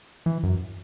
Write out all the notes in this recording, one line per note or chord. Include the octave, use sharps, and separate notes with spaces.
E3
F#2